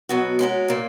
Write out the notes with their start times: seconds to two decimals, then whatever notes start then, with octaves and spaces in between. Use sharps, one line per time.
0.09 B2 F#3 B3 F#4
0.39 G#3 C#4 F#4 A#4
0.68 A#2 A#3 C#4